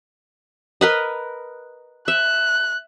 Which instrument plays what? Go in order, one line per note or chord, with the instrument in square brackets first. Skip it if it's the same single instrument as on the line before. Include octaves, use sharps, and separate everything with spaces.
[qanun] A#4 B4 D#5
[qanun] E5 [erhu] F#6